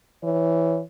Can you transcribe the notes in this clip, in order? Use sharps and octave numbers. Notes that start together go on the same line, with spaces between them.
E3 C#5